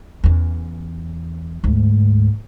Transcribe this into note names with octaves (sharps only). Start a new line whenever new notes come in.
E2 C#4
D2 G#2